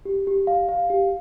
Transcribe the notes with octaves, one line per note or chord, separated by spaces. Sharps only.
G4
G4
F5
F5
G4